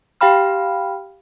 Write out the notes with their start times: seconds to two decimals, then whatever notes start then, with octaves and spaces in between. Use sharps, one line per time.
0.21 G4 F5 G5 B5 F6